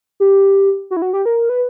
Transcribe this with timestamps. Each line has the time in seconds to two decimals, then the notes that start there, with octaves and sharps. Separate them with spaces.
0.20 G4
0.91 F#4
0.97 E4
1.02 F#4
1.13 G4
1.25 A#4
1.49 B4